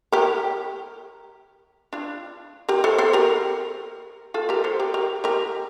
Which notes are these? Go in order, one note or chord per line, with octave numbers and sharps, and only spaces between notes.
G4 A#4
D4 F4
G4 A#4
A4 C5
A4 C5
G4 A#4
F4 A4
G4 A#4
A4 C5
G4 A#4
G4 A#4
G4 A#4